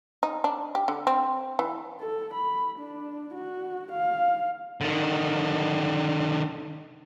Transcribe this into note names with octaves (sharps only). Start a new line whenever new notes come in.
D#4
D4
G4
D3
C4
E3
A4
B5
D4
F#4
F5
D3 D#3